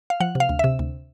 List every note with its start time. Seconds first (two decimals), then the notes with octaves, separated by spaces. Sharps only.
0.10 F5
0.20 F3 F#5
0.35 C3
0.40 F5
0.49 D2
0.59 C3 E5
0.79 D2